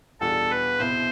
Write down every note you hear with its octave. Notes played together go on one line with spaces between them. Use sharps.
E2 B2 G3 D4 F4 A4
B4
C2 B2 B3 E4 C5